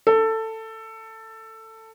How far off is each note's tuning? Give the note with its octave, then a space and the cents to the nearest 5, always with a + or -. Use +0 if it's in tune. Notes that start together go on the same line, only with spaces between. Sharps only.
A4 +15